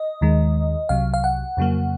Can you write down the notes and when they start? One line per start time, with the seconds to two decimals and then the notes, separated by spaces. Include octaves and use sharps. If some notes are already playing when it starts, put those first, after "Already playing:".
Already playing: D#5
0.21 D#2 D#3 G#3
0.89 C2 C3 F#3 F5
1.14 F5
1.24 F#5
1.57 F2 C#3 F#3 A#3